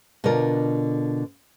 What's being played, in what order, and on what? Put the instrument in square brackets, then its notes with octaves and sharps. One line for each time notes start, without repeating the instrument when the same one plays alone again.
[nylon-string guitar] B2 D3 D4 F4 A#4